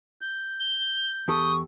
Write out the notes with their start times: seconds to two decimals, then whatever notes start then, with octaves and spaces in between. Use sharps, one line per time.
0.21 G6
0.60 G7
1.28 E2 G4 A4 C#6 D#6